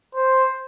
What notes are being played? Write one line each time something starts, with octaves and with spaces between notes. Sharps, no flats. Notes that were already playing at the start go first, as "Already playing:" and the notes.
C5